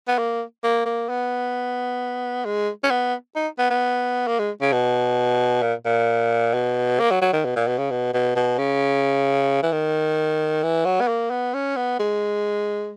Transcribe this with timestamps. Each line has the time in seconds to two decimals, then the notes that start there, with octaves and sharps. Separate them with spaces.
0.08 B3
0.18 A#3
0.64 A#3
0.86 A#3
1.09 B3
2.45 G#3
2.84 C#4
2.90 B3
3.35 D#4
3.59 B3
3.70 B3
4.27 A#3
4.39 G#3
4.62 C#3
4.73 B2
5.63 A#2
5.85 A#2
6.54 B2
7.00 A#3
7.11 F#3
7.22 F#3
7.33 D#3
7.45 B2
7.56 A#2
7.67 B2
7.78 C#3
7.91 B2
8.14 B2
8.36 B2
8.58 C#3
9.63 E3
9.72 D#3
10.63 E3
10.85 F#3
11.01 B3
11.08 A#3
11.31 B3
11.54 C#4
11.76 B3
11.99 G#3